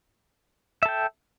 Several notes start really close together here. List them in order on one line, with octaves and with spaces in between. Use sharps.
E5 A4 G5